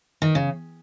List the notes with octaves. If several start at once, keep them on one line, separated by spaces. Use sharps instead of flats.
D#3
C#3